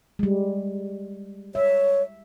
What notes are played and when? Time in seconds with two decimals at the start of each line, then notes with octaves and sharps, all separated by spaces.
0.19 G3 G#3
1.55 C#5 E5